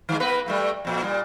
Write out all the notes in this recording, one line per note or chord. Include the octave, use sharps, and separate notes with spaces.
D#3 G#3
A#3 B3 B4
G3 A3 A#3
F2 A#2
A#2 G3